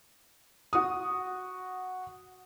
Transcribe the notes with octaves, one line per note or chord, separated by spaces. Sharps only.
F#4 D#6